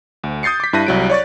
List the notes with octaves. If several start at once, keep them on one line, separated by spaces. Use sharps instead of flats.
D2
D#6 G6 A6 C7 C#7
D6 B6
G2 E4 A5 F#6 A#6 D#7
C2 F#3 D7
C#5 D5 C#6 A6